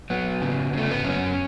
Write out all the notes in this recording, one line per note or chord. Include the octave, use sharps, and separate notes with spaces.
F#3 B3
C#3
C#3 A3
B3
F#2 C#4